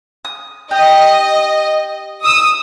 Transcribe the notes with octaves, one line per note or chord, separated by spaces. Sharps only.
D#6
G4 D#5
D#6 E6